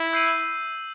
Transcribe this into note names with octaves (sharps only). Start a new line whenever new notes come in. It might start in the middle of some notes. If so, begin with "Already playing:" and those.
Already playing: E4
E6 G6 C7 D#7 F#7